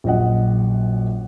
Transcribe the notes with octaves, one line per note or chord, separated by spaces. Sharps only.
A#1 F#2 D#5 F#5